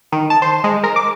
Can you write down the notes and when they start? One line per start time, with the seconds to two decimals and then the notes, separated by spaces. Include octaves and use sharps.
0.12 D#3
0.30 A5
0.42 C5
0.64 G#3
0.83 A#4
0.96 D6